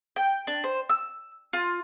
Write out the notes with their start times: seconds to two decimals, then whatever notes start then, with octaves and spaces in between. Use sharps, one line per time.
0.16 G5
0.47 D4
0.64 C5
0.89 E6
1.53 F4